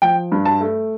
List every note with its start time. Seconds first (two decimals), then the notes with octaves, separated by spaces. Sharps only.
0.02 F3 G5
0.32 G2
0.45 A5
0.61 A3